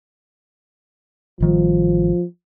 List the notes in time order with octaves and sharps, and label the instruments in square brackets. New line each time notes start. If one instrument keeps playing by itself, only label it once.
[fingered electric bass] A1 D#3 G3 [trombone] F3